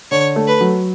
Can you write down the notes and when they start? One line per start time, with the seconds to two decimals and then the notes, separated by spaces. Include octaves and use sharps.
0.11 D3 C#5
0.36 A3
0.48 B4
0.61 F#3